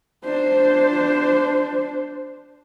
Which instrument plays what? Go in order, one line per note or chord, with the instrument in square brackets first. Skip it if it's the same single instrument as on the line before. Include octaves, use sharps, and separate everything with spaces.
[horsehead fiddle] D4 C5